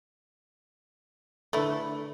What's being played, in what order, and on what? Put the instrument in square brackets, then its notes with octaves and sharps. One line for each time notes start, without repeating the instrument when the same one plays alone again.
[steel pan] D3 D4 B4 [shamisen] A3 E4